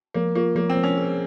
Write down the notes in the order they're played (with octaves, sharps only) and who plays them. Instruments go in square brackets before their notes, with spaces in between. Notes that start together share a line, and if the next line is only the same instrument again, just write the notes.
[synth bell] F3 [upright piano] A#3
[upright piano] A#3 [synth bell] F4
[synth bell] F3 [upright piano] A#3
[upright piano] C4
[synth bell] F3
[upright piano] C#4
[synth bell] G#4